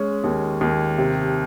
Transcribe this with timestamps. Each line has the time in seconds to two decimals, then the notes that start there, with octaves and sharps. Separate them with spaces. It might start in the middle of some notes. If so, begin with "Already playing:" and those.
Already playing: G#3 C#4
0.24 D#2
0.61 D#2
0.98 C3